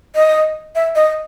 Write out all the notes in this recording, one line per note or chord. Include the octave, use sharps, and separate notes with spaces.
D#5
E5
D#5